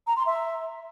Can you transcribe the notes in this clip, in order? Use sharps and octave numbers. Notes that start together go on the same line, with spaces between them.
A#5
C6
E5